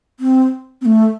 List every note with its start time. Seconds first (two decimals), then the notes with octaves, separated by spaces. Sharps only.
0.20 C4
0.81 C4
0.85 A3